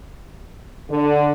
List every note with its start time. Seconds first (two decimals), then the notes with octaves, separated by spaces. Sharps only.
0.90 D3